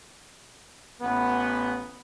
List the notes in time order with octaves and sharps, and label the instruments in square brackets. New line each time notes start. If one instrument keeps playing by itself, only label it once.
[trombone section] A1 B3